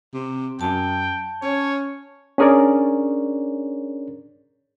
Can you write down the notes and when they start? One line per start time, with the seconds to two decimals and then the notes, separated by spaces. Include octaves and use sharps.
0.14 C3
0.61 F#2 G5 A5
1.43 C#4 C#5
2.38 C#4 D4 G#4 A#4 C#5 D5